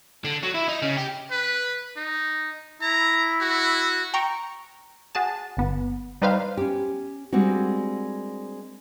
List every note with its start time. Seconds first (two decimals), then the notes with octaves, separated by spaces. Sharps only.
0.25 D3
0.43 F#3
0.54 E4
0.68 D#4
0.82 C#3
0.97 G4
1.31 B4
1.97 D#4
2.82 E4 A#5
3.41 F#4
4.14 G5 A#5 C#6
5.15 F#4 G#4 A5
5.57 G1 B3
6.22 G3 D#4 B4 C5 F5
6.57 C#4 G4
7.33 G3 G#3 A#3 C4 D4 F#4